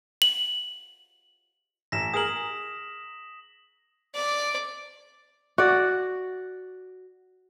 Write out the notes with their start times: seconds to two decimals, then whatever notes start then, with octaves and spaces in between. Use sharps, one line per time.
0.22 F#7
1.92 A1 A#6 B6 E7
2.14 G#4 A#4 D#6 F#7
4.15 D5
5.58 F#4 D5